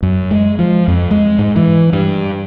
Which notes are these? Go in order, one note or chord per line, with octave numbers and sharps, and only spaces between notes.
F#2
G#3
F3
F2
G#3
G#2
E3
G2